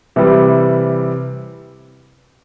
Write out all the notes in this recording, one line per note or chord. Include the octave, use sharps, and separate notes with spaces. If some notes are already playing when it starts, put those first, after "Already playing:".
C3 E3 G3